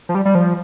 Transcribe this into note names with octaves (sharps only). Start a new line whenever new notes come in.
F3
G3
G3
F3